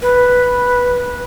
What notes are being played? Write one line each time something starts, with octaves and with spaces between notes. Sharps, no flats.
B4